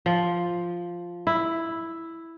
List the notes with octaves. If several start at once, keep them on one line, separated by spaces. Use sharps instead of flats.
F3
E4